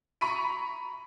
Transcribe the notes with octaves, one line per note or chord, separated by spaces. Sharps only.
A#5 B5 C#6 B6 D#7